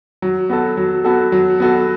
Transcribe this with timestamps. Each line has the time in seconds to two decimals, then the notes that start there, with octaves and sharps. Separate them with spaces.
0.22 F#3
0.49 B3 F#4 A4
0.77 F#3
1.05 B3 F#4 A4
1.32 F#3
1.60 B3 F#4 A4